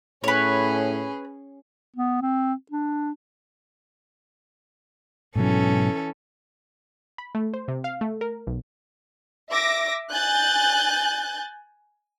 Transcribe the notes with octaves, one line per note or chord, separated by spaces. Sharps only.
A2 C#4 G#4 B4 C#5
B3
C4
D4
G#2 B2 E3 F#3 C#4 A4
B5
A3
C5
C3
F5
A3
A#4
B1
E5 D6 A#6
G#5 F#6 G6 A6